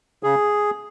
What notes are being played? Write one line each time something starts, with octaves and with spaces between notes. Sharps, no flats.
C#3 G#4